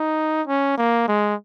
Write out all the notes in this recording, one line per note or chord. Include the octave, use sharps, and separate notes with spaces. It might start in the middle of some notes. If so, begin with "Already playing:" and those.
Already playing: D#4
C#4
A#3
G#3